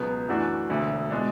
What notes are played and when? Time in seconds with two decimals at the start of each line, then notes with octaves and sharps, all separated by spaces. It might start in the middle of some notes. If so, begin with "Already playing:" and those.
Already playing: C#2 B2 F#3 B3
0.28 F#2 E3 A3 D4 F#4
0.70 E1 D2 D3
1.11 B2 G#3 D4